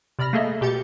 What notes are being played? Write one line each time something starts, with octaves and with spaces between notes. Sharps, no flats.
C3 D5 B5 F6 A#6
A3 A#3 G#4 A4 D#5 E5
B2 G4 G6 A6 C#7